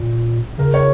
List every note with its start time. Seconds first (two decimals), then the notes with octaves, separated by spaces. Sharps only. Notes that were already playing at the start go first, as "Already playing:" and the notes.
Already playing: A#2
0.58 C#3 A#4
0.74 C#5